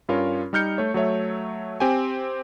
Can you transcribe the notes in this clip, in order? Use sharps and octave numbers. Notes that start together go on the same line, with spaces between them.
G2 C#4 F4 A#4 C#5
G3 D#4 F6 G6 C#7
A3 C#5
F#3 A3 C#5 E5
C4 G4 G5 G#5